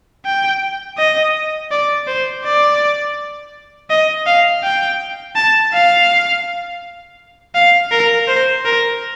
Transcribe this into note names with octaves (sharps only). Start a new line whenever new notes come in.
G5
D#5
D5
C5
D5
D#5
F5
G5
A5
F5
F5
A#4
C5
A#4